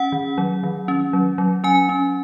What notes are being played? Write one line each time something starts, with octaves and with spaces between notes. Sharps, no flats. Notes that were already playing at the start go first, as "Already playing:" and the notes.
Already playing: C#4 F#5
D#3
F#3
D#3
C#4
F#3
F#3
C#4 G#5
C#4